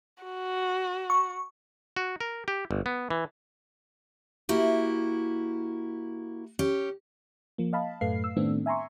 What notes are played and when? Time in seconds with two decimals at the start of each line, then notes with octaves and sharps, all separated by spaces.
0.24 F#4
1.10 C#6
1.96 F#4
2.20 A#4
2.48 G4
2.71 G1
2.86 B3
3.10 E3
4.49 A#3 E4 F#4 G4
6.59 C#4 G4
7.58 F3 A#3
7.73 D#5 F5 A5 B5
8.01 F#2 A2 A3 B4 F5 C7
8.24 E6
8.36 A2 D#3 A3 B3 C4 D4
8.66 E5 G#5 A#5 C6 C#6